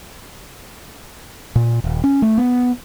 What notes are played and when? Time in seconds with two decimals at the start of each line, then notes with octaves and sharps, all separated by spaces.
1.56 A#2
1.84 D#1
2.04 C#4
2.22 A3
2.38 B3